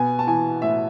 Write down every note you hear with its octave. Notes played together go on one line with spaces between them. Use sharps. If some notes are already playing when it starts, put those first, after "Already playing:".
Already playing: B2 B3 G#5
A5
E3 G#5
A2 E5